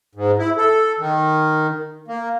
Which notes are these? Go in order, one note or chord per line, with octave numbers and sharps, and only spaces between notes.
G#2
E4
A4
D#3
A#3